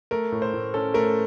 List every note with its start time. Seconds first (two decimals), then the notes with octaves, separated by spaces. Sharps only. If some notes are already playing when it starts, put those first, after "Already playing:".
0.11 A3 A#4
0.32 A2
0.42 C5
0.53 A2
0.74 C#4 A4
0.94 A3 A#4